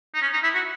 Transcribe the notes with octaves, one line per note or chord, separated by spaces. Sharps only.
D#4
C#4
D#4
E4
F#4